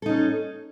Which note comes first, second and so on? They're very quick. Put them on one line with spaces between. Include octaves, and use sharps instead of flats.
A4 D#4 C#4